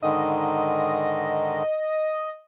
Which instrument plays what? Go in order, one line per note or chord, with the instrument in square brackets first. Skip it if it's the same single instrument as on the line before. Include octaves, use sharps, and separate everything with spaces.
[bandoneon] G#2 D3 D#3 [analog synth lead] D#5